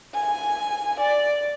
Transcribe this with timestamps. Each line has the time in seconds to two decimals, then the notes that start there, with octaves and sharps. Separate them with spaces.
0.15 G#5
1.00 D5